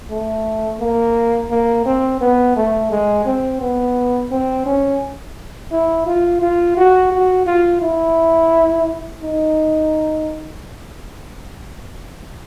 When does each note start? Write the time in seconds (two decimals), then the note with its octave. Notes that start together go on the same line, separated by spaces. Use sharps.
0.10 A3
0.81 A#3
1.51 A#3
1.86 C4
2.21 B3
2.56 A3
2.91 G#3
3.26 C4
3.61 B3
4.31 C4
4.66 C#4
5.72 E4
6.07 F4
6.42 F4
6.77 F#4
7.12 F#4
7.47 F4
7.82 E4
9.22 D#4